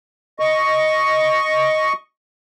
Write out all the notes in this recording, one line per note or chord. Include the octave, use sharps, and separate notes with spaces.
D#5 C#6